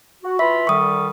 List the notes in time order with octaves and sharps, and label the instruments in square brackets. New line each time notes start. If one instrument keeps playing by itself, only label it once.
[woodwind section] F#4
[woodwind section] E3 F4 B5 [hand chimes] E5
[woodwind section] D3 D#3 G3 [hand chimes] C#6 D#6